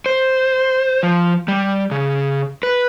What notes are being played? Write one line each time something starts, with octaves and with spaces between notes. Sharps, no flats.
C5
F3
G3
C#3
B4